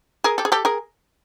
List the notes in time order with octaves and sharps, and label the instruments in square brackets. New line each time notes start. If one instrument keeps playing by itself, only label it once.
[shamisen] G#4 A#4
G4 A4
G#4
G4 A4
G#4 A#4